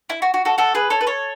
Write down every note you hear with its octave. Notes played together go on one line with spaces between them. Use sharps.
E4
F#4
F#4
F#4 A4
F#4 A4
G#4 B4
A4 C#5
B4
A4 C#5